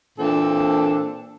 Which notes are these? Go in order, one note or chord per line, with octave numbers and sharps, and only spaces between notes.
A#2 E3 A#3 C4 D4 A4